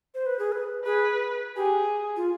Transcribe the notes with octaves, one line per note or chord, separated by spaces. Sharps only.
C5
B4
G#4
B4
G#4 B4
G4 G#4
F4